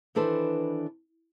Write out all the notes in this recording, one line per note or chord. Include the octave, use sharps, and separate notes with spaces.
D#3 E3 D4 A4 B4 C5